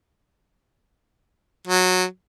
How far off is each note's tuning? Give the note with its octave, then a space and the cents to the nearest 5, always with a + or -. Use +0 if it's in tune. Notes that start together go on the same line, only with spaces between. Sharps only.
F#3 -15